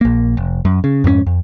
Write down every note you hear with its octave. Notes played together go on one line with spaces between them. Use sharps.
A#1 A#3
F1
F#2
C#3
F2 G#2 A3 C#4
F2